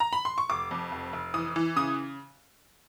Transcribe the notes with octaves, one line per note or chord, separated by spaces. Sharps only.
A#5
B5
C6
C#6
F1 D6
F2
F1
F1
E3 D#6
E3
C#3 D#6